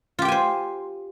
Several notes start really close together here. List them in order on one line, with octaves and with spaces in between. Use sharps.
F4 G4 G5 G#5 C5